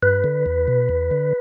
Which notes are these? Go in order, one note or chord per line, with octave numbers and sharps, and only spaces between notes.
G2 B4
D3
E2
B2
E2
D3